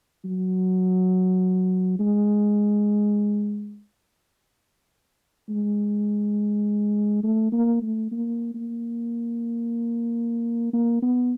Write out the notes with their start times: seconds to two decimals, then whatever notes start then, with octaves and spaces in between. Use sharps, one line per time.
0.25 F#3
1.99 G#3
5.49 G#3
7.23 A3
7.52 A#3
7.82 A3
8.11 A#3
8.55 A#3
10.73 A#3
11.02 B3